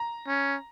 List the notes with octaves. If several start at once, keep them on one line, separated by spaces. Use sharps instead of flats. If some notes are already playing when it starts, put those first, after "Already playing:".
Already playing: A#5
C#4